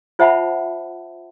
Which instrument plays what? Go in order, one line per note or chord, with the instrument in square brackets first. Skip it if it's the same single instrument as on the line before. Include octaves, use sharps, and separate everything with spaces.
[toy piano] F4 C5 E5 F#5 A5 B5